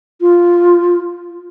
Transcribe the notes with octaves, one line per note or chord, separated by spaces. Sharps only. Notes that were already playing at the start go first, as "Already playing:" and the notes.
F4